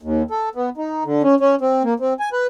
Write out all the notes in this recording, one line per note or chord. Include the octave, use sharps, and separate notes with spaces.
D#2
A4
B3
D#4
D3
C#4
C#4
C4
A#3
C4
G#5
B4